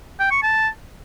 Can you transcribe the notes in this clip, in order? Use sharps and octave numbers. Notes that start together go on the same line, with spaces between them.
G5
C#6
A5